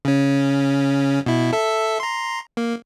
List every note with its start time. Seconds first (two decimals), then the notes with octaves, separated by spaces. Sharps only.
0.05 C#3 C#4
1.26 B2 E4
1.53 A4 E5
2.00 A#5 C6
2.57 A#3